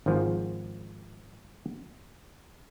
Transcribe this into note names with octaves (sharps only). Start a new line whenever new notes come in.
G#1 G#2 F3